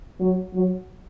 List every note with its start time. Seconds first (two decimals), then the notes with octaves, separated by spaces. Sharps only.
0.20 F#3
0.54 F#3